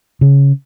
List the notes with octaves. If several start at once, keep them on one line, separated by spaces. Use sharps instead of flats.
C#3